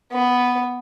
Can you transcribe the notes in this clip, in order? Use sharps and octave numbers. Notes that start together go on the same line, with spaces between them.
B3